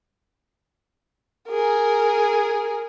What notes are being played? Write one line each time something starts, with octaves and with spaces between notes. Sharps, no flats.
G#4 A#4